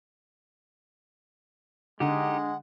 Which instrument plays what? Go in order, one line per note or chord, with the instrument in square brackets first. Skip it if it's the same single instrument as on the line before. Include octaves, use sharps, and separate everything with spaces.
[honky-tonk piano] D3 [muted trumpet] G#3 [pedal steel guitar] D#4 G4 [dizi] F#5